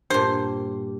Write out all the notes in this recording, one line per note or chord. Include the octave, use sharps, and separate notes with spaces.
G2 A#2 C5